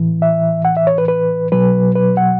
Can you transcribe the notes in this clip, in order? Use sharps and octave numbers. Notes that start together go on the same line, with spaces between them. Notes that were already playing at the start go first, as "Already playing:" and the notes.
Already playing: A2 E3
E5
F#5
E5
C#5
B4
B4
B2 F#3 B4
B4
F#5